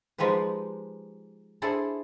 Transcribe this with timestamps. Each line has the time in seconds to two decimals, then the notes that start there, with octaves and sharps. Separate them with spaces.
0.18 F3 G#3 D#4 G4 B4
1.62 D4 E4 G#4 A4 C5 D5